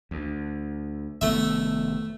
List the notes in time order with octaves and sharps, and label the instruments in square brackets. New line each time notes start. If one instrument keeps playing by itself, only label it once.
[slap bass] D2
[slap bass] F1 D#3 B3 [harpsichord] A3 E5